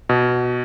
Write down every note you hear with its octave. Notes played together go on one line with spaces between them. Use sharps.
B2